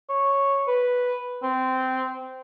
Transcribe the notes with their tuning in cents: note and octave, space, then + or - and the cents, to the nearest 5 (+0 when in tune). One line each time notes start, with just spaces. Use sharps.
C#5 -5
B4 +0
C4 -15